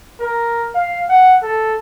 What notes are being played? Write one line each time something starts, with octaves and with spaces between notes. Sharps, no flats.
A#4
F5
F#5
A4